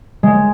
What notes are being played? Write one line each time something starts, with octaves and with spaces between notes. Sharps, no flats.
G#3